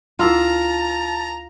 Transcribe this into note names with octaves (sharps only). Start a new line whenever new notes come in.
D2 E4 F4 A#4 A5 A#5 D6